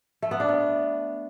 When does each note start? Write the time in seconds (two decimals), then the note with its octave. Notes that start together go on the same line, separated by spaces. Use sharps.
0.22 A3
0.31 B3
0.40 D4
0.49 B3